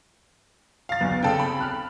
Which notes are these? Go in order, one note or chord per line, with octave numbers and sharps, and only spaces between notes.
F5 A6
B1 E2 B2
C#3 C4 A4 G5
B5
F6 F#6